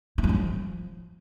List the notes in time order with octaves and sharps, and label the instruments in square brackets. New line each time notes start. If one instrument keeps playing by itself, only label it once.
[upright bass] E4
G#3
F#3
F3